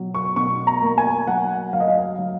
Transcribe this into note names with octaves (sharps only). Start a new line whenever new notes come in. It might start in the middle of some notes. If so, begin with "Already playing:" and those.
Already playing: B2 F#3
C#6
B2 C#6
A#5
A#3
G#5
F#3 F#5
F#3 F5
D#5
F5
F#3